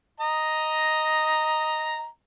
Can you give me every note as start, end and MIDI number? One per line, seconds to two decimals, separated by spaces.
0.20 2.06 75
0.20 2.06 82